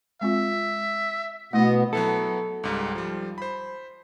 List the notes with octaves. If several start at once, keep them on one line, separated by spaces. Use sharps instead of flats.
G#3 C4 F4 E5
B2 A3 B3 E4 B4 D#5
F#3 B3 E4 A4
C#2 G#2 G3
F3 G3
C5 B5